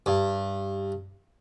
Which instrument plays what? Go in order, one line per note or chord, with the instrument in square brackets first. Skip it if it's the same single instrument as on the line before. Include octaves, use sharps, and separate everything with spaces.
[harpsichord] G2